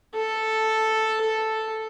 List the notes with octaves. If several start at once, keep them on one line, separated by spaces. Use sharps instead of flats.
A4
A4